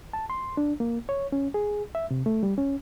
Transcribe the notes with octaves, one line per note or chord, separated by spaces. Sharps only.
A5
C6
D4
A#3
C#5
C#4
G#4
E5
C3
A3
G3
C#4